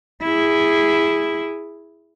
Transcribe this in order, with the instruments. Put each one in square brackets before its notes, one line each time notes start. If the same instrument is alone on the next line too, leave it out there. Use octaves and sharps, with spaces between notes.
[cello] E4 G#4